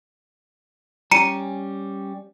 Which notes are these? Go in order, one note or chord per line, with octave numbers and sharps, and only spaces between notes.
G3 C#4 A#5 C#7 D#7